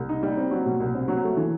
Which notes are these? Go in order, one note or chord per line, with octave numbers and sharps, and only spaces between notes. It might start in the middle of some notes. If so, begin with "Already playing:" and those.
Already playing: C2
D#4
G3
C4
F#3
B2
C2
C4
F#3
A3
E3